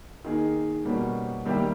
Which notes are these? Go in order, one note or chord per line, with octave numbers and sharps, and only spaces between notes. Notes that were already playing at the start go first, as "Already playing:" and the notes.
D#3 A#3 D#4 G#4
B2 G3 A#3 C#4
D#3 G3 A#3 E4 G4